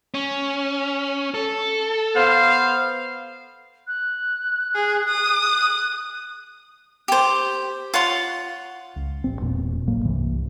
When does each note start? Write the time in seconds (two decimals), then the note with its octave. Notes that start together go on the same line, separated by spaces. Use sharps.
0.14 C#4
1.34 A4
2.16 B3 C5 F5
3.87 F#6
4.75 G#4
5.09 D#6
5.43 F#6
7.08 G4 C5
7.94 F4 C#5 F#5 C6
8.96 C#2
9.24 A1 C4
9.41 E1 E2 A#2
9.87 G#1 A2 F#3 A#3
10.04 C2 G2 C3 E3